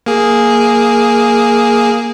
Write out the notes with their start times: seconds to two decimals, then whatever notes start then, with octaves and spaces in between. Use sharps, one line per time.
0.06 A#3 G#4